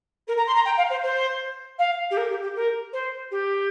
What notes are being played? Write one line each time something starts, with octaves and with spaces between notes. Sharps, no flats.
A#4
A#5
C6
A#5
G5
F5
C5
C5
F5
G4
A#4
G4
G4
A#4
C5
G4